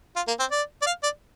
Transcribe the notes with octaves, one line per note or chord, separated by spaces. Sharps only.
F4
A#3
C4
D5
D5
F5
D5